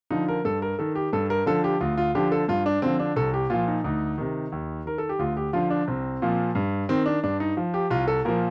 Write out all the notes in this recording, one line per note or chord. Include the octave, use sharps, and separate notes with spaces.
D3 F3 D#4
A#4
G2 A4
A#4
D#3 A4
G4
G2 A4
A#4
D3 F3 A4
G4
D2 F4
F4
D3 F3 G4
A4
G2 F4
D4
D3 F3 C4
D4
C2 A4
G4
A#2 F3 F4
D#4
D2 D#4
C3 D#3
D#2
D#3 A#4
A4
G4
D2 F4
G4
D3 F3 F4
D4
C2 C4
A#2 F3
G2
D#3 C4
D4
G2 D4
D#4
F3
G4
C2 F4
A4
A#2 F3 A#4